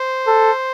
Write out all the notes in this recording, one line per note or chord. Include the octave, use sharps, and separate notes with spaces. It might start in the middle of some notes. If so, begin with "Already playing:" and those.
Already playing: C5
A4